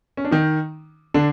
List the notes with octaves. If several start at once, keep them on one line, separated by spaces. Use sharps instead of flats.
C#4
D4
D#3 D#4
D3 D4